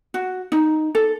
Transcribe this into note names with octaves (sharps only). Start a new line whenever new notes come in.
F#4
D#4
A4